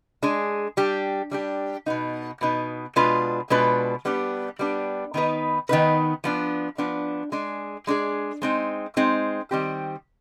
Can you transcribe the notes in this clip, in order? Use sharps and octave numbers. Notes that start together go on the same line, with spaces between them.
G#3 D4 G#4
G3 D4 G4
G3 D4 G4
B2 B3 D#4
B2 B3 D#4
B2 G#3 D4 F4 B4
B2 G#3 D4 F4 B4
G3 B3 D4 G4
G3 B3 D4 G4
D#3 B3 D#4 B4
D#3 B3 D#4 B4
F3 B3 D4
F3 B3 D4
G#3 D4 G#4
G#3 D4 G#4
G#3 C4 D#4
G#3 C4 D#4
D#3 G3 C4 G4